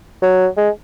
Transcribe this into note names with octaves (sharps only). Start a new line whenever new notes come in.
F#3
G#3